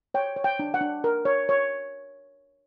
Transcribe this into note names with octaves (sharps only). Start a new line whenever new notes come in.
C#5 G5
C#5
G5
D4
F#5
D4
A#4
C#5
C#5